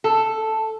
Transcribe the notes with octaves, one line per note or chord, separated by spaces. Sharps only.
A4